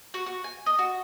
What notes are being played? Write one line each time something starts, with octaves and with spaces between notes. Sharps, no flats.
F#4
F#4
G#5
D#5
F#4